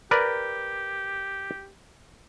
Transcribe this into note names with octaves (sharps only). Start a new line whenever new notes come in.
G4 A#4 B4 D5